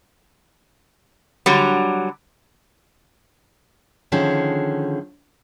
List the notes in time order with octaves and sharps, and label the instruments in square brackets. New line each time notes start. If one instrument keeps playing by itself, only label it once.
[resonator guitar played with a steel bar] D3 F#3 G3
[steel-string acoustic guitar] D3 D#3 F3 C#4 G#4